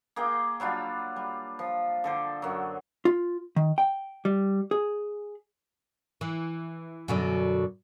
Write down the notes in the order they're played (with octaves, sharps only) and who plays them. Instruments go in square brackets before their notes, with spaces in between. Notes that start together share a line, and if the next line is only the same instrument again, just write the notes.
[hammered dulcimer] A#3 G#4 D#5 G5
F#3 G3 D4 F4
G3
F3
D3 A4 C5
F#2 F#3
[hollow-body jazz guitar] F4
D#3
G5
G3
G#4
[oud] E3
F#2 B2 D3